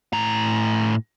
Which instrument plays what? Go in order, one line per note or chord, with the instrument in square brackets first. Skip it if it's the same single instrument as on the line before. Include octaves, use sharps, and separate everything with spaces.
[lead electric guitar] A2 A#5